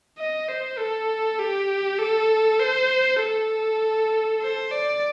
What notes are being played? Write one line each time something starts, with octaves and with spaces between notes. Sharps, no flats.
D#5
C5
A4
G4
A4
C5
A4
C5
D5